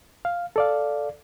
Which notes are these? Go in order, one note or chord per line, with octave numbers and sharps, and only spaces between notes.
F5
A4 D5 F5